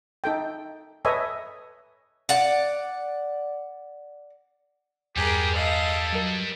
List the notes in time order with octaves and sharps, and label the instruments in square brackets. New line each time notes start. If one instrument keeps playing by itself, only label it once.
[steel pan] D#4 A4 G5
A4 B4 C#5 D#5 E5 G#5
[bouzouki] D5 F#5
[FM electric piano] E2 G2 [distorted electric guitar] G3 B4 [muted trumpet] G4 [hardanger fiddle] G#4 A#4
[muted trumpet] A4 [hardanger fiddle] D#5 F5
[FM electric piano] F#3 A#4